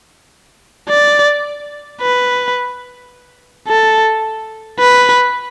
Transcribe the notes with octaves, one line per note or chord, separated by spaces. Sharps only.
D5
B4
A4
B4